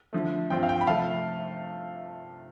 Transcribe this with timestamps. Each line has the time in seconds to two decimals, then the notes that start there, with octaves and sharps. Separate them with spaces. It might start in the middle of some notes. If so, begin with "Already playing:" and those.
0.13 D3 F3 A3
0.50 G2 F3 C4 F4 G5
0.63 F5
0.69 G5
0.81 B5
0.87 C3 F3 A3 F5 A5